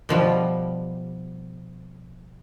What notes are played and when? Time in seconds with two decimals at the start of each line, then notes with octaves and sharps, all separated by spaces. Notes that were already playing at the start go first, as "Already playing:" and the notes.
0.09 B2 F3 G3